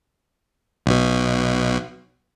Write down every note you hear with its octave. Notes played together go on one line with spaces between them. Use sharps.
B1 B2